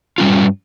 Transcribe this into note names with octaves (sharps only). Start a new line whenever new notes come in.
G2 G3 C#4 F4